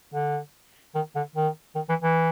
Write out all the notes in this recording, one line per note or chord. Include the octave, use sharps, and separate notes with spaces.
D3
D#3
D3
D#3
D#3
E3
E3